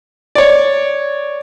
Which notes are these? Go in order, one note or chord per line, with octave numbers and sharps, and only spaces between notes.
C#5 D5